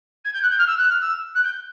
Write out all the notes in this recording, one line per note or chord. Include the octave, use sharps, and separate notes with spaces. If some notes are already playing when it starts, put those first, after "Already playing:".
G#6
G6
F#6
G6
F6
E6
F#6
F6
E6
F#6
G6